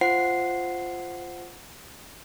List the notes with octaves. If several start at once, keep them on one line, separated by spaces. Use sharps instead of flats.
F4 C5 F#5 C7